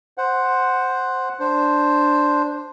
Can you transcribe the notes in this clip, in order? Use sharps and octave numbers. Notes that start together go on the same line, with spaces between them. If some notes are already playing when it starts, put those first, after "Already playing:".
C5 F#5
D4 C5